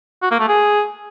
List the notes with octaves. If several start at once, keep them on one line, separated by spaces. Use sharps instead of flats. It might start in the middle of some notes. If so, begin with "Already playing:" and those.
F#4
A#3
A3
G#4